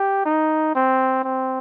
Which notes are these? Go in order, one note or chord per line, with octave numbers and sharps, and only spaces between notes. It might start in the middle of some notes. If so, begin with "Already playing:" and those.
Already playing: G4
D#4
C4
C4